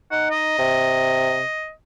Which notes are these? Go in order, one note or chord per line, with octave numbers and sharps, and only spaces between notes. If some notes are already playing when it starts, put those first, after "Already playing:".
D#4 F#5
D#5
C3